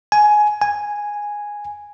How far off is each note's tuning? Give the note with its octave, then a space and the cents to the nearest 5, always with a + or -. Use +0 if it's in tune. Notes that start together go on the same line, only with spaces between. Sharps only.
G#5 +15
G#5 -5